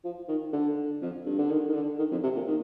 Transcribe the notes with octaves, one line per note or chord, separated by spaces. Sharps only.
F3
D#3
D3
F2
G2
D3
D#3
D#3
D3
D#3
F2
C3
A#2
D#3